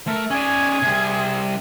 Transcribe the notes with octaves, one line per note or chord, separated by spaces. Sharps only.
A3 A#4
C#4 G#4 D5 G#5
C3 G3